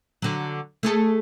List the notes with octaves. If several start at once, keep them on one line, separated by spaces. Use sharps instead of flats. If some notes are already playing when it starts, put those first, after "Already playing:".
D3 F#3
A3 G#4 A4